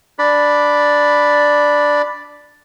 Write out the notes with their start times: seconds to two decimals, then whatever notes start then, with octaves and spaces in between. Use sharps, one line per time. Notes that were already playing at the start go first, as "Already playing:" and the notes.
0.19 D4 D5 B5